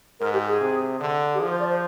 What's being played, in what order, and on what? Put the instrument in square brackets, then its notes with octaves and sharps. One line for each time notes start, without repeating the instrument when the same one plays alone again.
[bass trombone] G#2 [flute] A#4
[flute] G4
G#4
[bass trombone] C3
D3
[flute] G4
[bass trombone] F3 [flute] G#4
[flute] C5
D5
C5